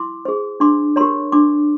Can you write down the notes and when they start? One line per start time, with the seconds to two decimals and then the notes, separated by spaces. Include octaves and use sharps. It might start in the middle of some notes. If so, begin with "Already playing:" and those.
Already playing: E4 C6 D6
0.25 G#4 C5
0.60 D4 C6 D6
0.96 G4 A#4 C#5 A#5 C6
1.32 D4 C6 D6